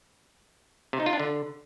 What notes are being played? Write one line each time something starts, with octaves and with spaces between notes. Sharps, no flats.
C3
D#4
F4
D4
D3